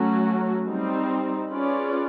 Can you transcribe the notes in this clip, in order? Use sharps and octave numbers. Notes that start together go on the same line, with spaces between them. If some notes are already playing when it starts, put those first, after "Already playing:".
Already playing: F#3 A3 C#4 F#4
G3 C4 D#4
C#4 F4 G#4 B4 D5